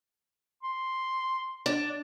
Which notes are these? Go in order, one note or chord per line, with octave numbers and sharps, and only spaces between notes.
C6
D4